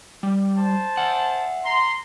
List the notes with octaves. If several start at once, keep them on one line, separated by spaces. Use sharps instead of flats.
G3
C5 A5
E5 F#5
A#5 C6